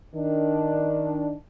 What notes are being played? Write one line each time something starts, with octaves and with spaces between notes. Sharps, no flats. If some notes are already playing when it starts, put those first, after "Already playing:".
D#3 D4